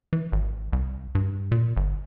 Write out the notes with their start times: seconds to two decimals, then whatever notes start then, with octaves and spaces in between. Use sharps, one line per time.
0.13 E3
0.32 G#1
0.73 C2
1.15 G2
1.52 A#2
1.76 G1